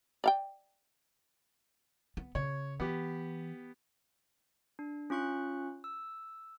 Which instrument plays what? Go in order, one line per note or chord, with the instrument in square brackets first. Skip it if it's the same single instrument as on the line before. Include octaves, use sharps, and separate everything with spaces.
[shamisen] D5 F5 G5
[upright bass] B3
[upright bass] C#3 [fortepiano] C#5
[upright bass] E3 [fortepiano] B3 G4
[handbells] D4
C#4 F4 C#6 F#6 C#7
E6